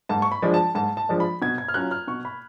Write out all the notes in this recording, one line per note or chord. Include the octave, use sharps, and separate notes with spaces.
G#2 A5
C#6
B5
F3 G#3 D4
A5
G#2 A5
A5
F3 G#3 D4
B5
B2 G#6
G#6
F6
F#3 C#4 F4 F#6
F6
B2 C#6
B5